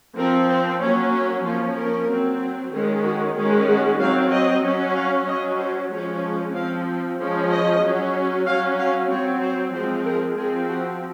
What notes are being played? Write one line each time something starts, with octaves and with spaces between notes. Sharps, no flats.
F3 C4 A#4
C5
F#3 A#3 C#4 C#5
C#5
F3 A#3 C#4 F4
A#4
F#3 C4
D#3 G#3 C#4 G#4
F#4
D#3 G#3 C#4
F#4
F#3 C4 F5
D#5
F#3 C#4
F5
F#3 C#4 D#5
C5
F3 G#3 C#4 C#5
F3 C4 F5
F3 G#3 C#4
D#5
F#3 C#4
F#3 C#4 F5
F5
F#3 C4 C#5
C5
F3 G#3 C4 C5
A#4
F3 C4 G#4
F#4